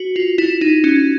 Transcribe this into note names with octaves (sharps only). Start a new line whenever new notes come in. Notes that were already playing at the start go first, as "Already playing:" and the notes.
Already playing: F#4
F4
E4
D#4
C#4